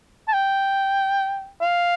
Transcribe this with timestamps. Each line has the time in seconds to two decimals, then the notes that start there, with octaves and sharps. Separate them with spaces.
0.28 A5
0.34 G5
1.61 F5